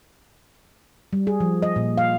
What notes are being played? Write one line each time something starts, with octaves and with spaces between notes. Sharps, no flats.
G3
G#4
F3
D#5
A#2
F5